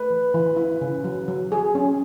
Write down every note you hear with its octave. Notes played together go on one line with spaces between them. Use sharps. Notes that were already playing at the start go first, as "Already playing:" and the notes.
Already playing: A3 B4
E3
E3
E4
C#3
F#3
F#3
G#4
C#4